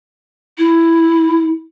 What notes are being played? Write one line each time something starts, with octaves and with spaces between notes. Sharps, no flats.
E4